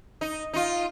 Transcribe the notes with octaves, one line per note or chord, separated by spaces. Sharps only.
D#4
D#4 F4